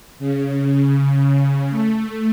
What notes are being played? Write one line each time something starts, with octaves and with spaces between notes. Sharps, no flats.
C#3
A3